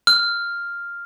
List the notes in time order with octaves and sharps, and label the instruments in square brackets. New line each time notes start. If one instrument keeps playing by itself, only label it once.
[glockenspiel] F6